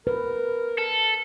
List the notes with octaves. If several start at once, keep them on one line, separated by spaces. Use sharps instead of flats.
A#4 B4
A4